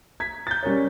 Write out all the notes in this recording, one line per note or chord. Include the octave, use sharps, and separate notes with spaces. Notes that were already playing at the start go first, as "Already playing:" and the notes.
G#6 B6
G6 A6
G3 C#4 A#4 C#5